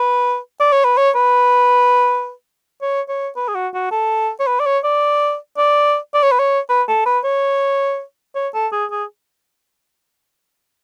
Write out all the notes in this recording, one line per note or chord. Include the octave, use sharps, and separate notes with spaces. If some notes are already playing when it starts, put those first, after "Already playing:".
Already playing: B4
D5
C#5
B4
C#5
B4
C#5
C#5
B4
G#4
F#4
F#4
A4
C#5
B4
D5
C#5
D5
D5
D5
C#5
B4
C#5
B4
A4
B4
C#5
C#5
A4
G#4
G#4